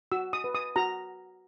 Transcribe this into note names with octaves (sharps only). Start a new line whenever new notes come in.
F#4 E6
D#6
B4
D#6
F#4 A#5